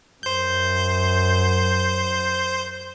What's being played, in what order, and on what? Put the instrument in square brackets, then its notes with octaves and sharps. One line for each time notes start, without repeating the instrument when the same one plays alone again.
[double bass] F#2 [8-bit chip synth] C5 G6